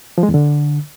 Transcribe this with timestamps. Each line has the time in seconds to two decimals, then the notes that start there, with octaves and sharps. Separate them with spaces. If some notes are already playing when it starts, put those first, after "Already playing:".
0.18 F3
0.23 G#3
0.29 E2
0.34 D3